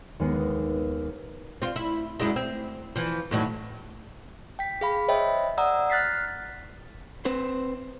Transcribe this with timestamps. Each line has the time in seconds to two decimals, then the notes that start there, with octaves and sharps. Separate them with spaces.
0.20 D#2 G#3 B3
1.62 C4 F4
1.76 E4
2.20 F#2 G#3 E4
2.36 C4
2.96 E3 F3
3.31 D#2 A2 F#3
4.59 G5 B6
4.81 G#4 F5 B5
5.08 C5 C#5 D#5 E5 G5 B5
5.58 D5 F#5 A#5 D#6 E6
5.90 F6 F#6 A6 B6 C7
7.25 C4 B4 C5